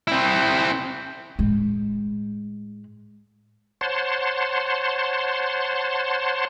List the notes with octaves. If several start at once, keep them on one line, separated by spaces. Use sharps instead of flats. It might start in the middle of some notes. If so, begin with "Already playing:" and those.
C4 E4
A2 G#3
C5 C#5 F#5 A5 C6